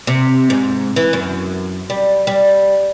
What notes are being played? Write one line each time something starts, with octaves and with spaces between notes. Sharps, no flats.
C3
G#2
E3
F#2
G3
G3